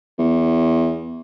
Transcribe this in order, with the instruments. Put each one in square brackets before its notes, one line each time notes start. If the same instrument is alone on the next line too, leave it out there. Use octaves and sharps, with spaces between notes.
[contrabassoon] E2